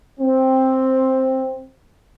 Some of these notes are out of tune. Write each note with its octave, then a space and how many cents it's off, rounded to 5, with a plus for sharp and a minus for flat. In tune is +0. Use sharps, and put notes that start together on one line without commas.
C4 +5